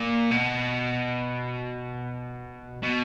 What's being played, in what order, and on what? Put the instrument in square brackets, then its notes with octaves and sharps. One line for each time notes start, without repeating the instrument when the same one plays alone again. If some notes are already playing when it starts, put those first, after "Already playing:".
Already playing: [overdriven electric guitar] A#2
B2
B2